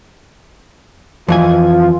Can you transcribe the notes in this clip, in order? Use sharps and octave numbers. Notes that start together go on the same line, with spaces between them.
F2 E3 F4 G#5